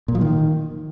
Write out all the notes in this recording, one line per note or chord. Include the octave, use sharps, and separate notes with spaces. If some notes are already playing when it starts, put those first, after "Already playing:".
A#2
F3
D#3